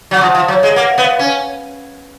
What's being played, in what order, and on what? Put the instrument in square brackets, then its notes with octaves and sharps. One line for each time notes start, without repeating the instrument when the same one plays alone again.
[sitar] F#3 [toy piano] F#5
[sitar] F3
[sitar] F3 [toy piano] F5
[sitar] F#3
[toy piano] C#5
[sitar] G#3
[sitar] A#3 [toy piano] F#5
[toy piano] F5
[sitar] B3
[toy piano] F5
[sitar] C#4 [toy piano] F5